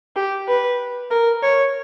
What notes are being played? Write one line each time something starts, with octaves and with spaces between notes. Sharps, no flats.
G4
B4
A#4
C#5